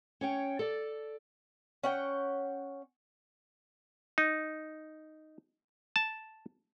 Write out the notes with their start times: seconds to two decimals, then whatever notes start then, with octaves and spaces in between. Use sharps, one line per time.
0.21 C#4 C#5 G5
0.59 A4 D5
1.83 C#4 F#5 G5
4.18 D#4
5.96 A5